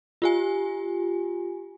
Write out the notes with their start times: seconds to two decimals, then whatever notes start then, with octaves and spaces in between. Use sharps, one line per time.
0.22 F4 G4 G#5